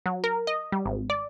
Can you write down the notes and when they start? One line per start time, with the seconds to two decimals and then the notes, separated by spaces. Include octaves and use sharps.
0.06 F#3
0.24 A#4
0.47 D#5
0.72 G3
0.86 G#1
1.10 D5